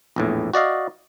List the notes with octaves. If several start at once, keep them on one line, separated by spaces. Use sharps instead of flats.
A#1 E2 A2
F#4 D5 D#5 F5